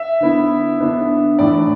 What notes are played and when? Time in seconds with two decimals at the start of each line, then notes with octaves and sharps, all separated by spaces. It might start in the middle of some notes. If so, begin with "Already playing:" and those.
Already playing: E5
0.20 D3 B3 E4
0.80 D3 B3 D4
1.39 A2 E3 D4 D5